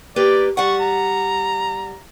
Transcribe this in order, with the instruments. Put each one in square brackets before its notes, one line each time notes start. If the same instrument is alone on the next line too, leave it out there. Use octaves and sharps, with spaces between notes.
[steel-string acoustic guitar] A#3 G4 B4 [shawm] D5
[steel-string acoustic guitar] G3 F#5 [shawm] C#6
[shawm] A#5